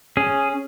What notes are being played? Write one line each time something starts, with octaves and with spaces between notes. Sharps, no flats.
C#4 G#4